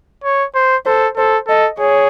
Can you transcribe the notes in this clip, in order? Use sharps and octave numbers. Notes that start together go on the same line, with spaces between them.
C#5
C5
A4 C5
A4 C5
A4 D#5
G#4 C#5